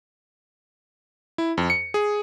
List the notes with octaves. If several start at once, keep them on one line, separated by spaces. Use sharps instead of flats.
E4
F2
C#7
G#4